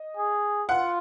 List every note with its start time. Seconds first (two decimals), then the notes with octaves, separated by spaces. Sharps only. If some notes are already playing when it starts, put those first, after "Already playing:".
Already playing: D#5
0.17 G#4
0.69 F4 F#5